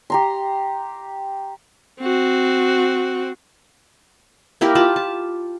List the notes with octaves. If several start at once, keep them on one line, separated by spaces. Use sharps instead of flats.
G4 A#5 C6
C4 F#4
A#3 E4 G4 A#4
F4 G4 A5 B5
A5